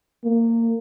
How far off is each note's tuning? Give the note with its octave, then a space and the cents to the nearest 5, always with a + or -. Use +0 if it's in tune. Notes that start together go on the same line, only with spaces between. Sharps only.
A#3 -20